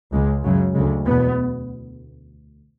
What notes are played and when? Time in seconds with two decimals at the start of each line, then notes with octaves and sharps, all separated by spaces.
0.12 C#2 C#3 G#3
0.43 F#2 C#3 F#3
0.74 D2 C#3 G#3
1.06 E2 B2 B3